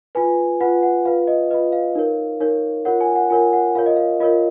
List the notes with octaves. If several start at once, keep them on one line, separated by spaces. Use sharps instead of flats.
F4 B4 G#5
F4 B4 F#5
F#5
F4 B4 F5
D#5
F4 B4 D#5
F5
D#4 A#4 C#5
D#4 A#4 C#5
F4 A#4 C#5 F#5
G#5
F#5
F4 A#4 C#5 G#5
F#5
F4 A#4 C#5 F5
D#5
F5
F4 A#4 C#5 D#5